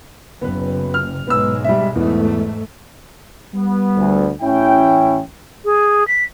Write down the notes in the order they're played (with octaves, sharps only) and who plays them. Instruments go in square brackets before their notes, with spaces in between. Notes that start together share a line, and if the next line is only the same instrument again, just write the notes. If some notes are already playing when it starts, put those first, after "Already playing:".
[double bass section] F#1 [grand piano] B3 B4
[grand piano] F6
[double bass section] B1 G#2 G#3 [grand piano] B3 E6
[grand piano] G3 E5
[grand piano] E2 E3 [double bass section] G#2 A3
[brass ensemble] G3 B3
[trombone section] D2
[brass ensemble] A1 G5 [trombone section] C#4 E4
[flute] G#4
B6